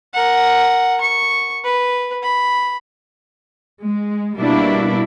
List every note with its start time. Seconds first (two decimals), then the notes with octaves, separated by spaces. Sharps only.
0.13 A#4 F#5
1.01 C#6
1.64 B4
2.22 B5
3.80 G#3
4.37 B2 G3 A#3 D4 E4